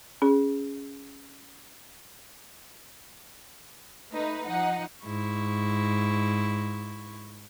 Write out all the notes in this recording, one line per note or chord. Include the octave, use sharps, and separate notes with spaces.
C#4 G#4
A3 D#4 B4
F3 D#4 F#5
G#2 E4 C#6